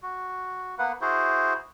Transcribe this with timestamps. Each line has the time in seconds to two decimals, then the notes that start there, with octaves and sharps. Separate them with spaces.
0.03 F#4
0.78 A#3 B3 B4 F#5
1.01 E4 F#4 G#4 C5